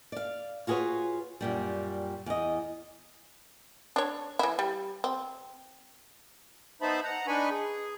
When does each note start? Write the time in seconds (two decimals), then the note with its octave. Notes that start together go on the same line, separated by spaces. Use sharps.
0.12 D5 F5
0.67 F4 F#4 G#4 A4 B4 C#5
1.41 F#2 A#2 G3
2.26 E2 D#5
3.96 D4 C#5
4.39 E3 E4
4.59 G3
5.04 C4
6.82 B3 D#4 C5 E5 A5 B5
7.04 F#5 A#5
7.27 D4 D#4 B4 G#5 B5 C#6
7.51 G#4